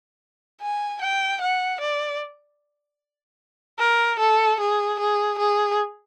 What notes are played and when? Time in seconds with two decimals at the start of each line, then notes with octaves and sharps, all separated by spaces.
0.61 G#5
1.02 G5
1.41 F#5
1.81 D5
3.79 A#4
4.19 A4
4.60 G#4
5.00 G#4
5.38 G#4